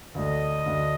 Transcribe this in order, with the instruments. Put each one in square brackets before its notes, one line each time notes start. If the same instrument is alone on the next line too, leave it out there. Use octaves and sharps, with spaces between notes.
[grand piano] D2 D3 A3 D4 [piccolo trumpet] D#5
[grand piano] D2 D3 A3 D4